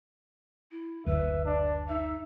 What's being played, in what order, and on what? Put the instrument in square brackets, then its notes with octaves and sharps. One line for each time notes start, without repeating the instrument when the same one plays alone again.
[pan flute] E4
[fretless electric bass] F#1 D2 [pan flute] B4 [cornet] E5
[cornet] D4
[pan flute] D#4 [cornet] E5